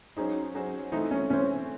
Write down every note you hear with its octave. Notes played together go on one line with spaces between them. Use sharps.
F#3 C#4 D#4 G#4 C5
F#3 C#4 G#4 C5
E3 A3 C4 D#4
C#4
E3 A3 C4 C#4